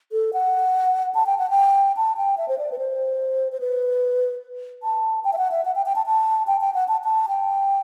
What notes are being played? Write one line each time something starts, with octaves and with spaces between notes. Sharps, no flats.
A4
F#5
A5
G5
F#5
G5
A5
G5
E5
C5
D5
B4
C5
C5
B4
A5
G5
E5
F#5
E5
F#5
G5
G5
A5
A5
G5
G5
F#5
A5
A5
G5